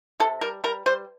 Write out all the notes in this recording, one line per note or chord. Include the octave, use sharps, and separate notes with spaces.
C3 A4
G3 A#4
G3 A#4
G3 C5